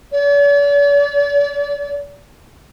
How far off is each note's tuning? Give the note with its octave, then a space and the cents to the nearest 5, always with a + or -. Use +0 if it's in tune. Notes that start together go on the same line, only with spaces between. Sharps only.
D5 -45